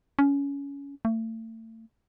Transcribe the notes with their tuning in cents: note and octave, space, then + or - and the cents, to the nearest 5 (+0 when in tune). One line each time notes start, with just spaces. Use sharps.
C#4 +20
A3 +35